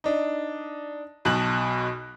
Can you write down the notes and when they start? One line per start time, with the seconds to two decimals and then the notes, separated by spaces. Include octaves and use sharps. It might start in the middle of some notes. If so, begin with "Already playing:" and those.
0.04 D4 D#4
1.25 B1 B2 A5 B5 F#6 F#7